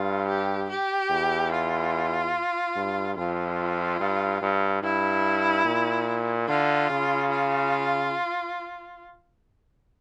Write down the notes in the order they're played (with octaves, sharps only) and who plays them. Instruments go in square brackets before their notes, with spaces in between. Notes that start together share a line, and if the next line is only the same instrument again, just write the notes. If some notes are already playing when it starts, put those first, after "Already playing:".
Already playing: [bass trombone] G2 [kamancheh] F4
[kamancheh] G4
G4
[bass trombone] E2
[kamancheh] F4
[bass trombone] G2
[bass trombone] F2 [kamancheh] F4
[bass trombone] G2
G2
[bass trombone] G2 [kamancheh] E4
[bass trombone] A#2
[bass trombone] D3 [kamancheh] F4
[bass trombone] C#3
[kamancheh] F4